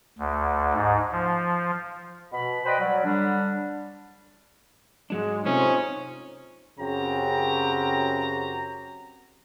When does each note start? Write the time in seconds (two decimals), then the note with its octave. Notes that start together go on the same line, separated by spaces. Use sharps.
0.19 D2
0.74 G#2
1.12 F3
2.32 B2 B5
2.65 B4 C5 D5 D#5 G5 B5
2.78 F#3 G3
3.04 D3 G3 D4
5.10 G#2 F#3 G#3 D4
5.45 C3 F3 A3 C#4 D#4
6.79 F#2 C#3 C4 F#4 G4 A#5